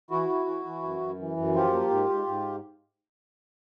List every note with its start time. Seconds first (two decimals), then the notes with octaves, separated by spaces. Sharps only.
0.10 E3 E4 F#4
0.29 E3
0.46 E3
0.65 E3
0.83 F#2
1.00 F#2
1.19 E3
1.36 F#2
1.54 F3 F4 G4
1.73 A#3
1.90 G#2
2.09 G#2
2.27 G#2